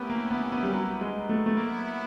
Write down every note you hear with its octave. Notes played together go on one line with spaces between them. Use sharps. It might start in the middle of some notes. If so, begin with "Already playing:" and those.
Already playing: A3 B3 C#4 E4 G4 A#4
A#3
B3
B3
G3
F#3
G#3
A3
A3
F#3 A#3 B3 E4